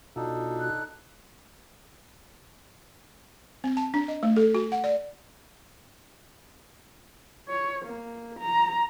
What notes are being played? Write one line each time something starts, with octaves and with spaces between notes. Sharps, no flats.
B2 D4 D#4 F4 F#4 A4
F#6
C4
A5
D4
D#5
A3
A4
F#4
F#5
D5
C#5
A#3
A#5